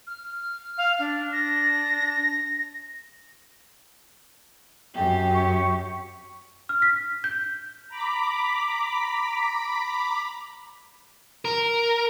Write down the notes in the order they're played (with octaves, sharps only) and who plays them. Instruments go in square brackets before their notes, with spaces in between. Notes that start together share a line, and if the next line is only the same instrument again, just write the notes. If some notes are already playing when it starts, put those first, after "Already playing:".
[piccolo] F6
[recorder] F5
D4
[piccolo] A#6
[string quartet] F#2 G4
[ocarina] C#6
[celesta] F6
B6
G6
[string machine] A#5 B5 D6 B6
[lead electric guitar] A#4